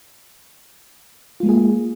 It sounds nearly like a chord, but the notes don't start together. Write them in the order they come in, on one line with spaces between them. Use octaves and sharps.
F4 G#3 A#3 G#4